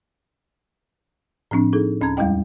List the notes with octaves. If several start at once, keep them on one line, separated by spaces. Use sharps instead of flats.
A2 F3 C4 D4
D#4 G#4 A4
D2 C#4 A5 A#5 G#6
E2 G3 G#3 E4 D#5 G5